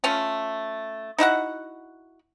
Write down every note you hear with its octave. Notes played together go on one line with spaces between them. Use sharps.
A3 C#4 F4
D#4 E4 F#4 F#5